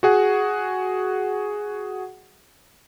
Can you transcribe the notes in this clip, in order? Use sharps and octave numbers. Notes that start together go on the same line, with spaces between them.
F#4 G#4 F#5